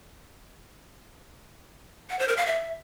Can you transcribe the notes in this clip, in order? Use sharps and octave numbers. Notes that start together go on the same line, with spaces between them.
F#5
C5
A#4
F5
E5